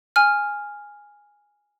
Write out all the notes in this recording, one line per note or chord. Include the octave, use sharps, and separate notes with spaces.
G#5 F6